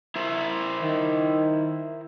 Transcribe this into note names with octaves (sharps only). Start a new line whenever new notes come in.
E4 A#4 C5
D#3